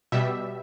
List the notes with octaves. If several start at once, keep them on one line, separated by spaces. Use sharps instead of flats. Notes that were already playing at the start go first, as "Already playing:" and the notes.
B2 G3 E5